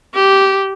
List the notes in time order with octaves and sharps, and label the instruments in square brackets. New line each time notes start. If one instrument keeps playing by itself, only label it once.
[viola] G4